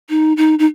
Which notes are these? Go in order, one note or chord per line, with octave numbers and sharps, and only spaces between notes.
D#4
D#4
D#4